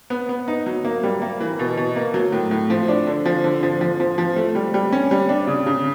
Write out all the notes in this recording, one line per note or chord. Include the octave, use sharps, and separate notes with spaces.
B3
B3
D#4
F#3
A#3
G3
A#3
E3
B2
B2
A#3
F#3
A2
A2
F3
D4
D3
F3
D3
F3
F3
F3
F3
A3
G3
G3
C#4
G3
D4
C#3
C#3